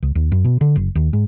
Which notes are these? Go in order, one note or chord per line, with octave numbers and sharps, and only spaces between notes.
C#2
D#2
F#2
B2
D3
F#1
D#2
G#2